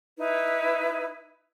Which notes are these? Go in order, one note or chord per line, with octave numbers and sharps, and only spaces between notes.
D#4 E4 B4